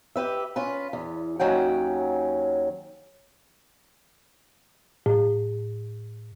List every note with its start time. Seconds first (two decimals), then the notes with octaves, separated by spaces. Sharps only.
0.16 G4 B4 E5
0.56 C#4 F4 B4
0.93 E2
1.39 D#2 F#3 C#4 F#5 G5
5.06 A2